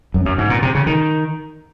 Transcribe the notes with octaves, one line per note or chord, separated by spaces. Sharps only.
F#2
F#2
G#2
A#2
C3
C#3
D#3